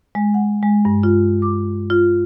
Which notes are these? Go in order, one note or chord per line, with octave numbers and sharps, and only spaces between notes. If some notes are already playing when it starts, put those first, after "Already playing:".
G#3
F#5
G#3
G2
F4
D6
F4